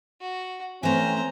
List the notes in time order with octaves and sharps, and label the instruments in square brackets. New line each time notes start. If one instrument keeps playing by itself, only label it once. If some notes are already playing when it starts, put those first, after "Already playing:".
[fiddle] F#4
[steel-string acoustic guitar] E3 A3 [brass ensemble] C4 C#4 [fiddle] C5 A#5 [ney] G#5